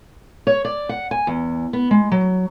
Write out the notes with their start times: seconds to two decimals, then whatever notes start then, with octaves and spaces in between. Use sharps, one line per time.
0.47 C#5
0.65 D5
0.89 F#5
1.11 G#5
1.27 E2
1.73 B3
1.91 G#3
2.11 F#3